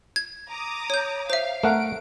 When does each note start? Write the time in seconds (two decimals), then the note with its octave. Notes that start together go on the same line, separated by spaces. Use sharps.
0.16 G#6
0.49 A#5 D6 D#6
0.90 C#5 G6
1.30 C5 E5 F5
1.63 A3 A#4 F#5 D7